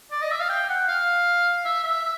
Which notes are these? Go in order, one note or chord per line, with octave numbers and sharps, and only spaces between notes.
D5
D#5
E5
F5
G5
F#5
F5
E5
E5